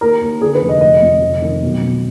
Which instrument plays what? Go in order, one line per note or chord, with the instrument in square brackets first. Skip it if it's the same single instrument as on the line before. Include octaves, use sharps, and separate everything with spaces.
[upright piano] D#2 A#4
D#2
D3 G#4
B4
F1
D#5
F1 D#5
F2
F1
D#3
B1
B2